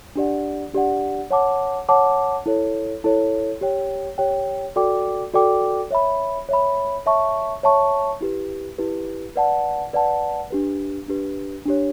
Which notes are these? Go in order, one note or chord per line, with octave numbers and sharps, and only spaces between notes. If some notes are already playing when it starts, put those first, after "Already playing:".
D4 G4 D5 F#5
D4 G4 D5 F#5
C#5 F#5 A5 D6
C#5 F#5 A5 D6
E4 A4 C#5
E4 A4 C#5
G4 C#5 G5
G4 C#5 G5
F#4 A4 D5 G5 D6
F#4 A4 D5 G5 D6
C#5 E5 B5
C#5 E5 B5
C#5 E5 A5 C#6
C#5 E5 A5 C#6
E4 G4 B4
E4 G4 B4
B4 D5 F#5 A5
B4 D5 F#5 A5
D4 G4 B4
D4 G4 B4
D4 G4 C#5